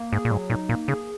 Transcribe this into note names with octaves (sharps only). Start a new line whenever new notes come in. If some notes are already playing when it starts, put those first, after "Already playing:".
Already playing: A#3
G#2 G#4
A#2
G#2 F#3
A#2 D#4
A#2 A#3
C#3 G#4